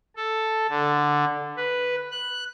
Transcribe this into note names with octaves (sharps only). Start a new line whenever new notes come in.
A4
D3
B4
F#6